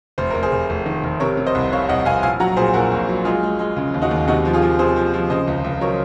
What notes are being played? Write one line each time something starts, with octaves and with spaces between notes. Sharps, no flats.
F1 C5
F1 A#4
G#4 C5
F1
F1
D#3
F1
C3 A#4 C#5
C3
C5 D#5
C2
C3 C#5 F5
C2 D#5 F#5
C2 F5 G#5
A#1 F5 G#5
F#3 F#5 A#5
A#2 G#4 C5
A#1 F#4 A#4
A#1
F#3
G#3 F4 G#4
G#3
G#3
C#3
D#2
D#4 F#4
D#2
C3 D#4 F#4
F3
F4 G#4
F3
C3 G#4 C5
F3
F3
C#3 C5 D#5
C#2
C#2
F#3 A#4 C#5